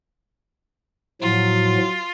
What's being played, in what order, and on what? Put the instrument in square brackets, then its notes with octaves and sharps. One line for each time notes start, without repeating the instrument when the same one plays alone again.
[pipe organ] A2 F3 [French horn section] F#3 [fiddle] F4